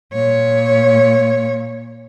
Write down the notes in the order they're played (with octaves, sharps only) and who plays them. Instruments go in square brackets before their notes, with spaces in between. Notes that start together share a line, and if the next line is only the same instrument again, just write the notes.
[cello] A#2 C#5